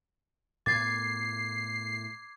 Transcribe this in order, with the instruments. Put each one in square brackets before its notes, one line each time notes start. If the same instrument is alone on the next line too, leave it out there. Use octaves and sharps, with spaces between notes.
[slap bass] A2 B3 [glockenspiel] D6 G#6 [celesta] A6 [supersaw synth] C7